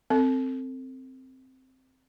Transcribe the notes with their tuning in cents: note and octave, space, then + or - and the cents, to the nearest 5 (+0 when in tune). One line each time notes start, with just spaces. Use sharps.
C4 +0 A4 +30